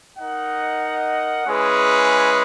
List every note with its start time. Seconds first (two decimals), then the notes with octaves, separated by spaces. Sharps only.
0.18 D#4 A#4 D#5 F#5
1.47 G#3 C#4 E4 G#4 B4